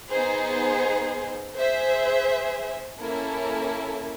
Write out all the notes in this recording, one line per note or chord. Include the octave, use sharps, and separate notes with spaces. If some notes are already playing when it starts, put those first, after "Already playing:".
B3 D#4 G#4 C5
G#4 C5 E5
A#3 C#4 E4 A4